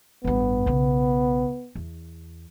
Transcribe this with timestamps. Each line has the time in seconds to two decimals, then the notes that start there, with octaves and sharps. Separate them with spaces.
0.24 A1 G2 B3
0.66 B1 C#3
1.75 E2